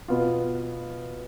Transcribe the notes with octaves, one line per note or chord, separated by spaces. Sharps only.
B2 B3 F4